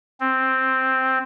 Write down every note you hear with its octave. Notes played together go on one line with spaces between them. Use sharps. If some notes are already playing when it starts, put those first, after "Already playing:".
C4